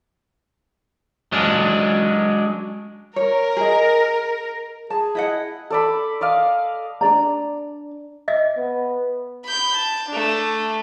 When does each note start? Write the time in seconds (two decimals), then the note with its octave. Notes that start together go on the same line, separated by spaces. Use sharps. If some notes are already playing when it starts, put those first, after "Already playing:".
1.32 F#3 G#3 C#4 D4
3.16 A#4 C#5
3.57 G#4 D#5
4.90 G#4 A5
5.15 E4 D#5 F#5
5.70 A4 D5 B5
6.21 D5 D#5 F5
7.01 D4 G#4 D5 A#5
8.28 D#5 E5
8.58 B3
9.45 B5 G6
9.75 A5
10.09 A3 D4